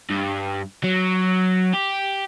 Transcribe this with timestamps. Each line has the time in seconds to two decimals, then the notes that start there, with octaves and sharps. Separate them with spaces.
0.10 G2
0.84 F#3
1.74 G4